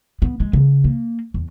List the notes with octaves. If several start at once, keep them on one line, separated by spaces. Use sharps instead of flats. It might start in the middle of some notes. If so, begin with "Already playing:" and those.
B3
G#3
C#3
A#3
E2